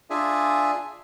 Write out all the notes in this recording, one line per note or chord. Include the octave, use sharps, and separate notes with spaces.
D4 F4 G#4 E5 G#5